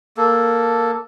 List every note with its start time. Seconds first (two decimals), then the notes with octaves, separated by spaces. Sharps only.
0.17 A#3 A4